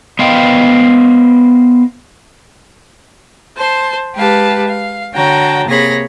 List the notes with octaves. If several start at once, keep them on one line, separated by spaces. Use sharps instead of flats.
B3 C5 D#5 F5 G5
C5 A5 C6
G#3 G4 B4 F5 A5
F5
D3 F#4 C#5 G5 A5 A#5
C3 A#3 G#4 C#5 B5 A#6